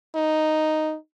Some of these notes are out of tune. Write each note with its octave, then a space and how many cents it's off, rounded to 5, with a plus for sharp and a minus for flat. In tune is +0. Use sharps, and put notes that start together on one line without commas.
D#4 -5